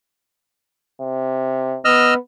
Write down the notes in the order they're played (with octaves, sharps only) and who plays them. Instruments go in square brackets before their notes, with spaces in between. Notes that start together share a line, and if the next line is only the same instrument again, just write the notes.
[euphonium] C3
[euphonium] B3 [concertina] D#5 E6 F6